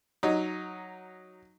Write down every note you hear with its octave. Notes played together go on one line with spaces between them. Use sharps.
F#3 D#4